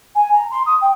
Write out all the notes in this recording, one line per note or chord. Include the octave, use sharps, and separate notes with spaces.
G#5
A#5
C6
D#6
G5